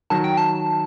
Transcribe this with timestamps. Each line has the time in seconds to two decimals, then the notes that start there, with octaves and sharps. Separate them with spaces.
0.10 D#3 F#3 A5
0.24 G5
0.37 A5